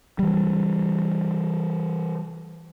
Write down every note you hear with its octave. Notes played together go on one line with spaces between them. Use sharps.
E3 G3